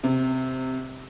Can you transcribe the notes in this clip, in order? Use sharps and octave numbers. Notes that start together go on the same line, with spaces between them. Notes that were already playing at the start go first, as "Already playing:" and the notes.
C3